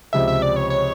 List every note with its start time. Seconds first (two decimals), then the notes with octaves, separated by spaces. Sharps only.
0.13 C#2 C3 F3 E5
0.28 E5
0.42 D5
0.56 C#5
0.70 C#5